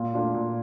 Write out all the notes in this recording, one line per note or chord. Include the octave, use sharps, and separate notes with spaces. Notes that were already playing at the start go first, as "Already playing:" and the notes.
Already playing: A#2
A3 D4 F4
A#2